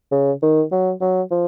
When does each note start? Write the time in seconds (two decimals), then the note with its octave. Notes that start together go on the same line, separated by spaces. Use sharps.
0.12 C#3
0.43 D#3
0.72 F#3
1.01 F#3
1.31 F3